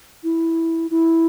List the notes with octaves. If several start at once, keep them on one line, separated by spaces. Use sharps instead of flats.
E4
E4